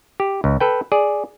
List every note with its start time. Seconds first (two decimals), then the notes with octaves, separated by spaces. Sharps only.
0.20 G4
0.44 C#2
0.60 A4 B4 G5
0.92 G#4 D5